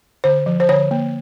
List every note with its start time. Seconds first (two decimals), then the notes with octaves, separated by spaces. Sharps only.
0.24 D3 C5
0.46 F3
0.60 C5
0.69 D3 C#5
0.91 A#3